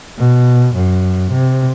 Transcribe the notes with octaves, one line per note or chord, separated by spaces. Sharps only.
B2
F#2
C3